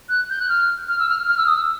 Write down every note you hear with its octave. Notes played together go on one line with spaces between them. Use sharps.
F#6
G6
F#6
F6
F6
E6
F6
F6
E6
D#6
E6